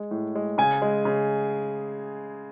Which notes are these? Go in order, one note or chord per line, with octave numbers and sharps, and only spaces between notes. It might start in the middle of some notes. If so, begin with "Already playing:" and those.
Already playing: G#3
A2
G#3
C#3 G#5
G#3
C#3